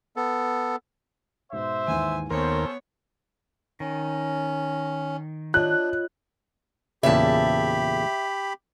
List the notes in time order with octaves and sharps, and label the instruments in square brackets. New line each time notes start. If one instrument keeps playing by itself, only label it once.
[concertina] B3 A4
[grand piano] G#2 B2 [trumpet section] C5 E5
[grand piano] D#2 G#2 E3 [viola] G#5
[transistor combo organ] D#2 A#4 [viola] B3 C#5 [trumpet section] C#4 A4 C5 [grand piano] C6
[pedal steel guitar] D#3 [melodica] C#4
[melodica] D4 [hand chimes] F4 C#5 D#5 [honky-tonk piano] F#6
[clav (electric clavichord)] E2 A#2 C#3 [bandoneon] G4 B5 [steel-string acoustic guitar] E5 A5